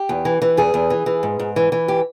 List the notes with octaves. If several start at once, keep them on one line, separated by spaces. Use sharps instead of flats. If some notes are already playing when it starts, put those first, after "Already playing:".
Already playing: G4
E2
E3
E3
E2 G#4
E2
E3
E3
G#2
G#2
E3
E3
G4